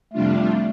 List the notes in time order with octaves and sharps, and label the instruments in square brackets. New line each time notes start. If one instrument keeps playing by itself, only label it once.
[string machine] F2 C3 G3 D4 F4 [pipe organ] A3